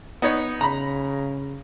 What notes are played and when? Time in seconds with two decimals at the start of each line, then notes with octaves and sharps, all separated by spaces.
0.22 B3 D#4 C#5
0.61 C#3 A#5 B5